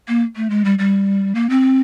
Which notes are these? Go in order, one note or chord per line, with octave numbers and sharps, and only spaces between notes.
A#3
A3
G#3
G3
G3
A#3
C4